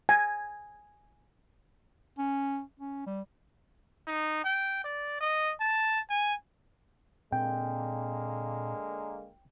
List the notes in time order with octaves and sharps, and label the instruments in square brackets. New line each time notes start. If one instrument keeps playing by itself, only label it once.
[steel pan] G#5
[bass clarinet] C#4
C#4
G3
[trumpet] D#4
G5
D5
D#5
A5
G#5
[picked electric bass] A#2 C4 [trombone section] D3 G#3 A#3 [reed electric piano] G5